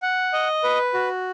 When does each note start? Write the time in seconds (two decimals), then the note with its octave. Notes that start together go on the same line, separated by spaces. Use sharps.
0.02 F#5
0.33 D#5
0.64 B4
0.94 F#4